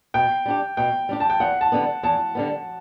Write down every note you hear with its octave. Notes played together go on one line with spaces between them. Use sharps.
B2 G5
G3 D4 G4
B2 G5
G3 D4 G4
A5
G5
E2 F#5
A5
D3 G3 B3
E2 A5
D3 G3 B3